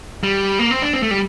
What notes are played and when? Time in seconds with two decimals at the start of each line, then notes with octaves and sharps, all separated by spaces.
0.24 G3
0.59 A#3
0.71 C4
0.82 D4
0.93 C4
1.03 A3
1.11 G3